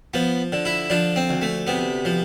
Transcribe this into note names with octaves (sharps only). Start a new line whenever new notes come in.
F3 B3
D3
E4
F3 D4
C4
D2
A3
C3 B3
F3